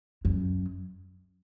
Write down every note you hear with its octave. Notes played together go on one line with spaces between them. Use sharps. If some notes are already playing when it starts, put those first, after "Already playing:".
F#2